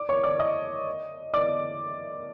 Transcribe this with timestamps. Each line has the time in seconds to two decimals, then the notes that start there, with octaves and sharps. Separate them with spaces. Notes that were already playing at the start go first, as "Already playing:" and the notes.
Already playing: D5 D6
0.09 C#5 C#6
0.23 D5 D6
0.39 D#5 D#6
1.34 D5 D6